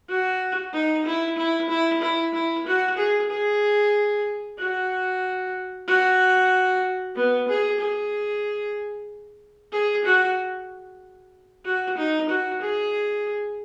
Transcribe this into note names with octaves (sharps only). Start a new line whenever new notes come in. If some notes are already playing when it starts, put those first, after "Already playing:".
F#4
D#4
E4
E4
E4
E4
E4
F#4
G#4
G#4
F#4
F#4
B3
G#4
G#4
G#4
F#4
F#4
D#4
F#4
G#4